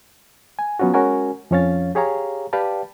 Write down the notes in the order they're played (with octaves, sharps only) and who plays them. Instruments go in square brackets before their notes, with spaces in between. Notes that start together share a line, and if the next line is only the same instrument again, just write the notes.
[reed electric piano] G#5
F#3 B3 C#4 F4 F#4
G#3 C#4 F#4 A#4 G#5
F2 F3 C#4 C#5 F5 A6
G4 G#4 C#5 F5 A#5
G4 B4 D5 F5 G5 A5